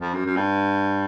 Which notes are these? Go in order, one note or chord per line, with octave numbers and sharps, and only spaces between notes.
F2
F#2
F#2
G2